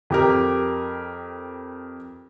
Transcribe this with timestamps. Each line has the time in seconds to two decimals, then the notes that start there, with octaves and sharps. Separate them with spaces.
0.10 F2 G4 A#4